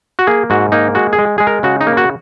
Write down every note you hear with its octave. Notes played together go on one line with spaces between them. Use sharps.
F#4
A#3 G#4
G#2 F#4
A#3 D#4
G#3 F#4
G#4
G#3
G#3 G#4
A#4
C#3 F#4
D#4
A#3
F#4